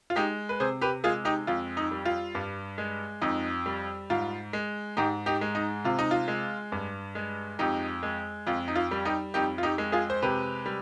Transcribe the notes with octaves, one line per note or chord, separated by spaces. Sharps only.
F4
G#3 D#4 G4
B4
C3 G#4 C5
G4 B4
G#3 F4 G#4
D#4 G4
F2 F4
D#4
G3
F4
G2
G#3
F2 D#4
G3
G#2 F4
G#3
G#2 D#4 G4
D#4 G4
G#3
D#4
C3 F4
D#4
F4
G#3
G2
G#3
F2 D#4 G4
G#3
F2 F4
D#4
F4
G3
D#4 G4
F2 D#4 G4
F4
D#4 G4
G#3
F4 G#4
C5
C3 G4 B4
G3